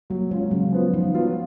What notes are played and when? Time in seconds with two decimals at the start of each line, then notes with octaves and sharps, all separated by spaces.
0.10 F#3 A#3
0.31 G#3 C#4 F4
0.51 C#3 F#3
0.72 F3 B3 F4
0.94 D#3 F3
1.14 F#3 B3 F4